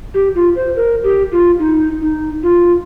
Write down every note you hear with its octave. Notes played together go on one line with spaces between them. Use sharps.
G4
F4
C5
A#4
G4
F4
D#4
D#4
F4